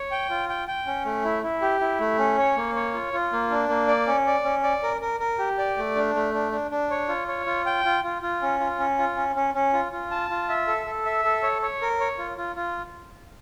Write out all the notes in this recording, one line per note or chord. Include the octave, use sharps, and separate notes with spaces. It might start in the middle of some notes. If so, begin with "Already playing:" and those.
Already playing: C#5
G5
F4
G5
G5
C#4
A3
E4
E4
G4
E4
A3
C#4
C#5
A#3
C#5
F4
F4
A#3
D4
A#3
D5
C#4
D5
C#4
D5
A#4
A#4
A#4
G4
D5
A3
D4
A3
D4
D4
D4
C#5
F4
C#5
F4
G5
F4
F4
F4
C#4
F4
C#4
F4
C#4
C#4
C#4
F4
F4
A5
F4
E5
A4
A4
E5
A4
C#5
C#5
A#4
C#5
F4
F4
F4